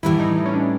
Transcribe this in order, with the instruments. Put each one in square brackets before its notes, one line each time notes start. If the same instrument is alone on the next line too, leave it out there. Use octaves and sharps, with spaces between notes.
[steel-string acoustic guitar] A2 E3 G3 [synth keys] E4
[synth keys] D#4
D#4
C#4
D4